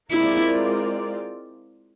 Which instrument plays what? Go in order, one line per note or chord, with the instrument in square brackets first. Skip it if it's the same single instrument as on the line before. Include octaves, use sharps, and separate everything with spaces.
[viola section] G#3 C4 F4 A#4 D5 [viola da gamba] E4